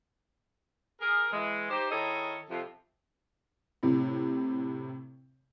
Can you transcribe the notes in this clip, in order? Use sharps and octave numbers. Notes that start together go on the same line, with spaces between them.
G#4 A#4
E3 G#3
D#4 G4 C5
D#3 E4 G#4 A4 C#5 D#5
F2 C3 F3
A2 C3